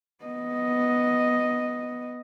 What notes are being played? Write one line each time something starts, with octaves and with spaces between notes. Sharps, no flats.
B3 D#5